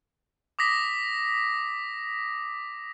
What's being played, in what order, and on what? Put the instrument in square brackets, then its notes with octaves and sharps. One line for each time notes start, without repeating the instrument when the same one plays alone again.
[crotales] D6 D#6 A#6 B6